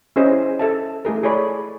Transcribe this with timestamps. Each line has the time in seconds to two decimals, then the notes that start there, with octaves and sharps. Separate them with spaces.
0.16 C#4 E4 G#4 C5 D#5
0.59 A4 E5 A5
1.05 A3 E4 G#4 A#4
1.23 G#4 A4 C#5 D5 B5